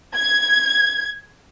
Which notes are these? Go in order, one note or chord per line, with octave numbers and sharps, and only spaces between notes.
G#6